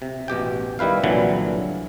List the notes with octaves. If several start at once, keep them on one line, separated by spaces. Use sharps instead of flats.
C3
A1 B2 G4 G5
D#3 G3 E4 B4 F5
C2 A#2 D3 E3 F#3